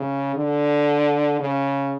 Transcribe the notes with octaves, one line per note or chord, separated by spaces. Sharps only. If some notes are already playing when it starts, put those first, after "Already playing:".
Already playing: C#3
D3
C#3